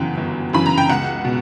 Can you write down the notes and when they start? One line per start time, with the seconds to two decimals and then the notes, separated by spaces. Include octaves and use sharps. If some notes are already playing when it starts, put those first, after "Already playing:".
Already playing: G1 F#2 C#3 E3 F#5 G5
0.17 G1
0.53 F#2 C#3 E3 B5
0.66 A#5
0.78 G5
0.89 C#2 F#5
1.25 B2